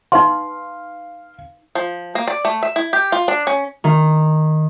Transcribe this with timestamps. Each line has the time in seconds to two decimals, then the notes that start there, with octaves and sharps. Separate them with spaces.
0.12 D#4 B4 F5 C6
1.75 F3
2.15 A#3
2.28 D5
2.45 A3
2.63 E5
2.76 E4
2.93 G4
3.12 F4
3.28 D4
3.47 C#4
3.84 D#3